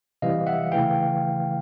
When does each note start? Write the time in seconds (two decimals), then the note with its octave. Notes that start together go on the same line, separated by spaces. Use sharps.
0.22 C3 E3 G3 D#5 F5
0.47 E5 F#5
0.72 C#3 E3 A3 F5 G5